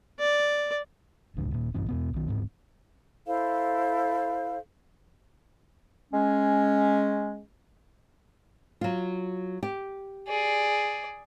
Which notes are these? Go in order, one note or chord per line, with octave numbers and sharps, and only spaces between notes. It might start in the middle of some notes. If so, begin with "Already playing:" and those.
D5
E1 C#2 G#2 D3
D#1 A#2
A#1 G2 E3 C#4
E2 B2 B3
B1 D#3
D1 G#2 C4
E4 A4 C5 F5
G#3 C#4
F#3 F4
G4
G#4 D5